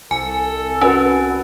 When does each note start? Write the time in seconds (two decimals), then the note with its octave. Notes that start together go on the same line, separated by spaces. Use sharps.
0.11 C2 A4 G#5
0.81 C#4 F#4 B4 G#5